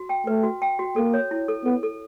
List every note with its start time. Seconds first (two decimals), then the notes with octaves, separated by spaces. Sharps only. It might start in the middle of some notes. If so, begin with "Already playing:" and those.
Already playing: F#4
0.09 G5
0.27 A3 B4
0.43 F#4
0.62 G5
0.79 F#4
0.96 A#3 A4
1.14 C#5
1.31 E4
1.48 A4
1.65 B3 A4
1.83 A4